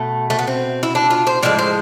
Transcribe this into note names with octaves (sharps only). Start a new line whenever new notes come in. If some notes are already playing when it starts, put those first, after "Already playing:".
Already playing: B2 A3
A3
B3
C4
E4
D4
F4
C5
A2 F3 G#3 D5
C5